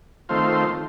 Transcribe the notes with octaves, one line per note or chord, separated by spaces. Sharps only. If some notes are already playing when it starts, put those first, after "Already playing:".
D#3 A3 C4 F4 C5